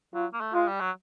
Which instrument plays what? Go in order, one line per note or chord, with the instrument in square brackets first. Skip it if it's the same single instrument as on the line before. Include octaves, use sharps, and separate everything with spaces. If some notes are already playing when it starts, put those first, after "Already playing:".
[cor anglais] F#3 [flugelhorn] F4
[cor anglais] A#3
A3
[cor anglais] G#3 [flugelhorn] F4
[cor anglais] G3
F#3